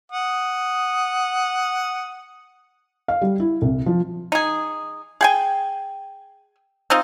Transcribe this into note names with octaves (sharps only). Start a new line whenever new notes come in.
F#5 D#6
F5
G3
E4
C2
F3
D#4 G#4
G#4 G5 G#5
C4 D#4 F4